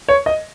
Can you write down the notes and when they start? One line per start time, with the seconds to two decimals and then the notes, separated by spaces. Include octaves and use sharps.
0.09 C#5
0.26 D#5